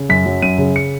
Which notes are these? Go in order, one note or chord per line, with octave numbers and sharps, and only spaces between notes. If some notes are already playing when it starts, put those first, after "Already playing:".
Already playing: C#3
F#2 B6
F#3
F#2 D#7
C#3
C#7